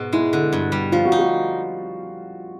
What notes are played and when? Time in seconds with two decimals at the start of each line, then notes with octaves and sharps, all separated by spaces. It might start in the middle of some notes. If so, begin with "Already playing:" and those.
Already playing: G#2 B2
0.13 G#3 E4
0.33 D3
0.53 G2
0.72 G3
0.92 F3 F4
1.05 F#4
1.12 D#4
1.19 F#4